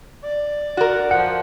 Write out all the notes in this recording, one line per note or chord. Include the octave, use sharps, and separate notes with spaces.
D5
F#4 A#4
F3 F#5